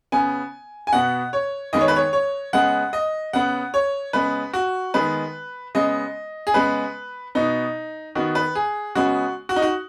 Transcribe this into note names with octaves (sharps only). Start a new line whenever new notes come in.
C#3 B3 G#5
G#5
B2 B3 F#5
C#5
D#3 G#3 B3 D#5
C#5
B4
C#5
C#5
C#3 G#3 B3 F#5
D#5
C#3 B3 F#5
C#5
C#3 G#3 B3 B4
F#4
D#3 G#3 B3 B4
C#3 G#3 B3 D#5
G#4
C#3 G#3 B3 B4
B2 B3 D#4
D#3 B3 F#4
B4
G#4
C#3 G#3 B3 F#4
F#4
D#4
F#4